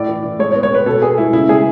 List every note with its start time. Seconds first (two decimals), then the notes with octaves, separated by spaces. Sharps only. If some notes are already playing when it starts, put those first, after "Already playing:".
Already playing: A2 D5
0.09 E3
0.24 A2
0.39 G#3 C#5
0.52 C#5
0.55 B3
0.63 C#5
0.70 B3 B4
0.86 B2 A4
1.02 B3 G#4
1.17 G#3 E4
1.33 C#3 E4
1.49 G#3 G#4